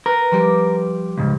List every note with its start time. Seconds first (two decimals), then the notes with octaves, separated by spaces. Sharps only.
0.06 A#4 B4
0.31 F3 G3 G4
1.18 C#2 G#2